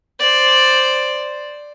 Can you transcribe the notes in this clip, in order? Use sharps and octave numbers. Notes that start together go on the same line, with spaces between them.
C5 D5